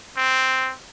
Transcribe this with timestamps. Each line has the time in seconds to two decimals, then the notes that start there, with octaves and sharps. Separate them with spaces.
0.17 C4